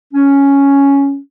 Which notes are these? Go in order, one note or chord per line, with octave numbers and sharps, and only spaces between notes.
C#4